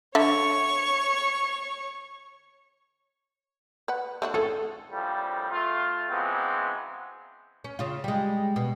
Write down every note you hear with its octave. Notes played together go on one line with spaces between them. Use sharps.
D3 C#5 E5 C#6
B4 F#5
A3 D4 F#4
C4 C#4 G#4 A4
A#1 F2 A2 F3 G3
A3 F4
C#3 E3 F#3 G#3 B3 C4
C#4
C#3 F4
G3 G#3
B2